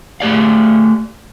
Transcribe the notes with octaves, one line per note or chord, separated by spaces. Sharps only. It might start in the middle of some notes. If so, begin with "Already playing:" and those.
A3 G4 D5 F5